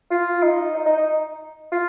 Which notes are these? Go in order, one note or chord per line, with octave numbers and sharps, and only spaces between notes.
F4
D#4
D#4
D#4
D#4
F4